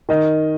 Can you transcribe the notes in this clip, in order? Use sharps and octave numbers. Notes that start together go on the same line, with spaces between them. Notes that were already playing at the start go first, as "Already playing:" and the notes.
D#3 D#5